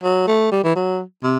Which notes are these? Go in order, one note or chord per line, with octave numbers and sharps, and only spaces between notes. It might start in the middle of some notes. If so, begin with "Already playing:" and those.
F#3
A3
G3
E3
F#3
C3